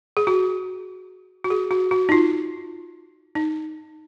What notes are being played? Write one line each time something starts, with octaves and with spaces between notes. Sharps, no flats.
G#4
F#4
F#4
G#4
F#4
F#4
D#4
F4
D#4